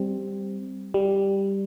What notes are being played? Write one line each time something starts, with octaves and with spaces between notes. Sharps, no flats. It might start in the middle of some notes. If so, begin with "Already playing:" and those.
Already playing: G3 C4
G3